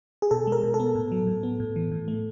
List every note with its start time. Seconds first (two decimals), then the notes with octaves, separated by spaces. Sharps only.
0.22 G#4
0.31 B2 A4
0.47 G#3
0.52 A#4
0.63 B2
0.74 A4
0.79 B3
0.95 A2
1.12 F#3
1.27 A2
1.43 B3
1.60 A2
1.76 E3
1.91 A2
2.08 A3